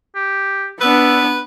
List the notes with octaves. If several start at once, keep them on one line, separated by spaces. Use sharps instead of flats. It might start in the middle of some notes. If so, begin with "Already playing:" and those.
G4
B3 D4 B4 E6